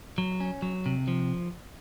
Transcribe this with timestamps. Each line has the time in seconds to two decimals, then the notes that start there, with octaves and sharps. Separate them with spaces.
0.18 F#3
0.40 C#4
0.62 F#3
0.86 C3
1.08 F3